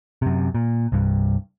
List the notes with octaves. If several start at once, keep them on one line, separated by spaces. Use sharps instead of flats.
F#2 C3
A#2
C2 G2